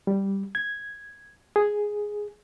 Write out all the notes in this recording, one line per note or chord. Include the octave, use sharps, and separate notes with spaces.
G3
G#6
G#4